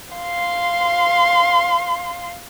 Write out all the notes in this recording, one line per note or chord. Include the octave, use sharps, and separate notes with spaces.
F5 C6